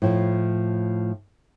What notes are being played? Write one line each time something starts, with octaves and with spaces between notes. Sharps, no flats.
A2 F3